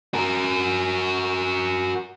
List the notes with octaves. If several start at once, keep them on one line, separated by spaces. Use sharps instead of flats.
F#4 A#4